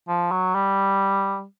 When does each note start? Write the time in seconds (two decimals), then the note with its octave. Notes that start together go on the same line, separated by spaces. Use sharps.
0.08 F3
0.31 F#3
0.55 G3